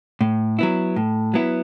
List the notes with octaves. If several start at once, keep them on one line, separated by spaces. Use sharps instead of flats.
A2
F#3 B3 E4
A2
F#3 B3 E4